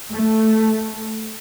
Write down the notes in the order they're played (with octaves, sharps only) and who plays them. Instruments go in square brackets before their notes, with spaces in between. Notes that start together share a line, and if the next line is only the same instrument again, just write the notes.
[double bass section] A3